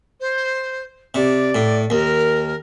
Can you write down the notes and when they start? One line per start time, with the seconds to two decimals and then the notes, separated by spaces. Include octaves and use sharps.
0.20 C5
1.15 C3 D5
1.55 A2
1.90 D#2 A#4